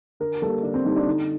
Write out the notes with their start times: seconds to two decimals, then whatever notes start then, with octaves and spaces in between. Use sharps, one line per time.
0.20 D3 A#4
0.42 G3 A#3 A4
0.63 D3 D4
0.74 C4
0.85 G3 A#3 D#4
0.96 D4
1.07 D3 D#4